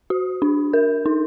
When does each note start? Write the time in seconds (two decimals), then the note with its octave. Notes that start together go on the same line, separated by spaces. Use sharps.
0.10 F#4
0.42 D4
0.73 A#4
1.06 D#4